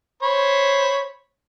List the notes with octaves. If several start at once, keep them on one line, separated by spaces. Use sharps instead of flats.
C5 C#5 B5